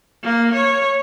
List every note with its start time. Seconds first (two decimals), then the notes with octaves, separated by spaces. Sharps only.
0.24 A#3
0.54 C#5